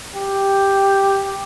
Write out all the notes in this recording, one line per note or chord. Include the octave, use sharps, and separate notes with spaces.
G4